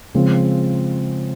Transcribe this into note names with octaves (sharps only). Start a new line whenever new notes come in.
C#3 F3 G#3 C4